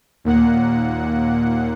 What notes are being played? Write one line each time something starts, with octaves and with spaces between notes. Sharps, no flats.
D#2 A#2 A#3 F#5